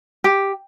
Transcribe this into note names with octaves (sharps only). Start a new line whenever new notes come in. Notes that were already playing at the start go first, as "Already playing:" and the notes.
G4